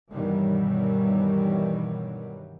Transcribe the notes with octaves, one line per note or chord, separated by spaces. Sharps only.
G2 B2 D#3 E3 F#3 G3